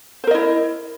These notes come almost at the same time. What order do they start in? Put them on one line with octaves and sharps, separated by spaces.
C5 A#4 D#5 E4